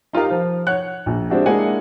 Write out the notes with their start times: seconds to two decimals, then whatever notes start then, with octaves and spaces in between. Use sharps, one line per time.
0.13 D#4 F4 G4 A#4 F5
0.30 F3
0.67 C#5 F#5 F#6
1.06 A#1
1.30 G#3 C4 D4 E4 F#4 G4
1.46 G#3 A#3 D4 E4 F#5 G#5